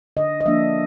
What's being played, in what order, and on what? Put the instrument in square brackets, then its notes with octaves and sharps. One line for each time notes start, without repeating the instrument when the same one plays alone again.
[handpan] D3 D#5
D#5
F3 A#3 D4 E5